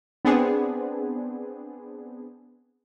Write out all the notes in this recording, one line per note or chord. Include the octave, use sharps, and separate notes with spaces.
B3 C4 D4 G#4